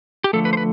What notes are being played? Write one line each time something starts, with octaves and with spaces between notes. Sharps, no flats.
G4
D3 F3 A3 A4
B4
C5
B4